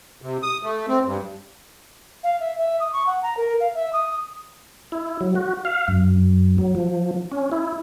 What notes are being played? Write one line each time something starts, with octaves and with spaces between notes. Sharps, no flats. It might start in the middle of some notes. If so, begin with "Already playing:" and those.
C3
D#6
A3
C4
G2
F5
E5
E5
D#6
C#6
F#5
A#5
A#4
F5
E5
D#6
E4
F#3
F#4
F5
F#2
F#3
F3
C#4
E4